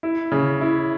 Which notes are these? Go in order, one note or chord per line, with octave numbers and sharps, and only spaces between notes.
E4
C#3
E4